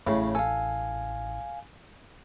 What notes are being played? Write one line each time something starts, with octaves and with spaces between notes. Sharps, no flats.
A1 A2 C#3
A4 F5 G#5